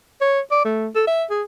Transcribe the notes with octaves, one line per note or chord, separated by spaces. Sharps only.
C#5
D5
A3
A4
E5
G#4